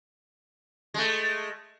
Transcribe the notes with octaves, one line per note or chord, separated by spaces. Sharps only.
G#3 A3